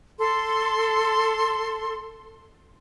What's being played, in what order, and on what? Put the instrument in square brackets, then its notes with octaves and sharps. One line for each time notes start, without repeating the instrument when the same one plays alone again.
[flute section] A4 C6